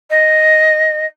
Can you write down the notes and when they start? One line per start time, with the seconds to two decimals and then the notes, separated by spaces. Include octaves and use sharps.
0.10 D#5